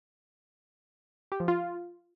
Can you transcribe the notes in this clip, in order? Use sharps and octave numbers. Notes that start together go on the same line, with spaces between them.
G4
F3
F4